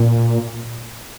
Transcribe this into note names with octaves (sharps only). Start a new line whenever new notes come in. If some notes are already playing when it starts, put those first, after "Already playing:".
Already playing: A#2